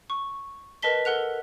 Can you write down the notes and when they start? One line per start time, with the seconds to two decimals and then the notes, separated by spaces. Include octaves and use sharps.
0.10 C#6
0.82 A#4 B4 D#5 A5 B6 G7
1.05 A4 A#4 F#5 F#6 F7